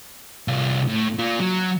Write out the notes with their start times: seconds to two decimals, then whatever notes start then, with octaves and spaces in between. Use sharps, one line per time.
0.48 C2 F4
0.88 A2
1.19 A#3 F4
1.40 F#3